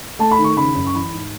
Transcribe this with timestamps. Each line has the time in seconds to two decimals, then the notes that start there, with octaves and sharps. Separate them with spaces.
0.19 A3 A5
0.31 B5
0.39 D#3
0.44 C#6
0.57 C#3 B5
0.75 F#2
0.87 C#6
0.94 E3 B5
1.13 G#2